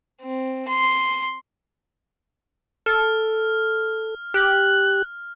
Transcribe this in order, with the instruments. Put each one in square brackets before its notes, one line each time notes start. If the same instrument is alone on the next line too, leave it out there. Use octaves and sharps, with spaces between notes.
[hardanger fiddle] C4
C6
[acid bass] A4 [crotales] F6
[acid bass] G4 [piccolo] F#6